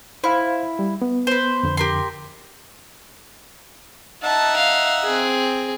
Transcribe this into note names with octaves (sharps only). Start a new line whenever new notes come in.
E4 C5 F5 B5
G3
B3
B4 C5
F2 D3
G4 A#4 C6
D#4 E5 F#5 A5
F5
C4 G#4